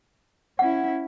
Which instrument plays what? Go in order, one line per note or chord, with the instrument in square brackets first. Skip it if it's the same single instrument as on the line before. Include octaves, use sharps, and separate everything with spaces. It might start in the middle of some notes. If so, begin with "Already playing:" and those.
[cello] C#4 E4 [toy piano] F#5